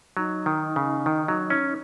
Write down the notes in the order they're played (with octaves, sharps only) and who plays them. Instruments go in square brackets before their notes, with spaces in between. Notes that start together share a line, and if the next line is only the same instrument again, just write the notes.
[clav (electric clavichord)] F#3 [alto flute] D#4
[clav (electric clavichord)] D#3
C#3
D#3
F#3
C#4